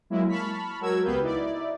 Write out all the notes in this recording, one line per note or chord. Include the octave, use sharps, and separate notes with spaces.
F#3 G#3 A#3 E4
A5 B5 C#6 F6 B6
F#3 G#3 F#4 A#4 E6 G#6
C#2 B3 G4 B4 F5 G6
D#4 E4 D5